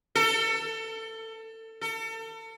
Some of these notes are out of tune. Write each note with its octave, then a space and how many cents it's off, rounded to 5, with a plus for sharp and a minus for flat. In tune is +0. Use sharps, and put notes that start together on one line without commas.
A4 +25
A4 +35